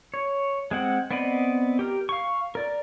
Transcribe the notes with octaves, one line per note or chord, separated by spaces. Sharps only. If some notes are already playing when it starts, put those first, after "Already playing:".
C#5
G#3 C4 F#5
B3 C4 D5 D#5 B5
G4 A#4
F5 C#6
A#4 D5